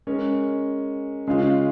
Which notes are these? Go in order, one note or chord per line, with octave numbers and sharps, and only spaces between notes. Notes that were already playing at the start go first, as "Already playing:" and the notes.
G#3 C#4 A#4
C#3 G#3 C#4 F4